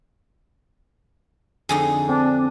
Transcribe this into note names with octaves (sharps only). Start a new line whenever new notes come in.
F2 D3 D#4 G#4
C4 D4